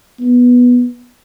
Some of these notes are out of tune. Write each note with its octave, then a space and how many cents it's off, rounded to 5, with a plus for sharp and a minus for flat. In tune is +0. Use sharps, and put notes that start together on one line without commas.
B3 -10